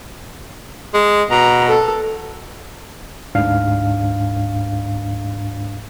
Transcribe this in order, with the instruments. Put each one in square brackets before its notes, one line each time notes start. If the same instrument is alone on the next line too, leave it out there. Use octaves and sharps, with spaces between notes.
[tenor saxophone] G#3
[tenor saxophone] B2 [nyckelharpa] A#5
[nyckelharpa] A4
[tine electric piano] D2 G#2 D4 F5